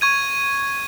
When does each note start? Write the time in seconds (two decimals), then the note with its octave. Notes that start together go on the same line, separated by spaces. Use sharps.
0.01 C#6 G#6 D#7